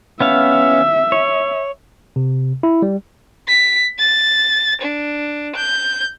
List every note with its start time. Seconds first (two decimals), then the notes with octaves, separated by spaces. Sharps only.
0.21 B3 C#4 E5 F5
1.12 C#5
2.16 C3
2.63 E4
2.82 G3
3.47 B6
3.99 A6
4.81 D4
5.56 G6